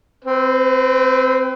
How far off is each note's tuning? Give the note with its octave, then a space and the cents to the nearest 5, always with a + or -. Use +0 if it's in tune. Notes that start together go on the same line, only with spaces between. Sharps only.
C4 +0 B4 +40